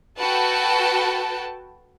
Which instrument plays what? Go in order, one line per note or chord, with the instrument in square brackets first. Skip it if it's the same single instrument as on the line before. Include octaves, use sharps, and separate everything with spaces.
[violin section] F#4 A4 B4 G5 A5